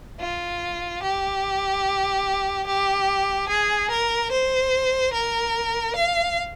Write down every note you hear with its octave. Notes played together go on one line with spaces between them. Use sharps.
F4
G4
G4
G#4
A#4
C5
A#4
F5